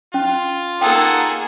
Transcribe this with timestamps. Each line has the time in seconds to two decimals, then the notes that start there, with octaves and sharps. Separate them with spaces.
0.14 C#4 F4
0.81 A#3 D#4 G#4 A4 F#5 G5